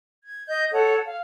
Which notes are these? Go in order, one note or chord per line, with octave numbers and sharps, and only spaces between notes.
G#6
D#5 G6
A4 C#5 F#5
F5